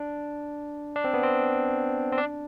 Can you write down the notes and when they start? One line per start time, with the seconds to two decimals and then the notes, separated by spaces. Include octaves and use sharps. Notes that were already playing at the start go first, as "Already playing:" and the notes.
Already playing: D4
0.96 D4
1.04 C4
1.14 B3
1.23 C4
2.12 C4
2.18 D4